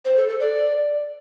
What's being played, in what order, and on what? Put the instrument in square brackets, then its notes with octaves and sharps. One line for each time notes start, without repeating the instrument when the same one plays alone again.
[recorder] C5
A4
A4
D5